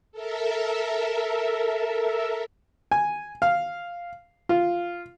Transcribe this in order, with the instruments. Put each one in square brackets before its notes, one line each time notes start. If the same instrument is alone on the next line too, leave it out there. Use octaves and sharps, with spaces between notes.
[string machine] A4 A#4 E5
[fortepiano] G#5
F5
F4